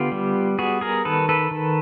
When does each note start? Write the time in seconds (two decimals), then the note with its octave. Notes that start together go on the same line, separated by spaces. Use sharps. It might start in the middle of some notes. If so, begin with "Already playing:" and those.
Already playing: D3 B3 F4 G4
0.12 G3
0.59 B3 F#4 G#4
0.81 G#4 A#4
1.05 D#3 A4 B4
1.29 A4 B4
1.51 D#3